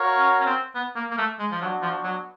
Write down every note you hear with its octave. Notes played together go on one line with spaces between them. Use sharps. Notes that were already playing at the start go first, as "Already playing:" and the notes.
Already playing: F#4 A#4 C#5 F5
C#4
C#4
C4
B3
A#3
A#3
A3
G#3
F3
F#3 B3 D4 F#4
F3
F#3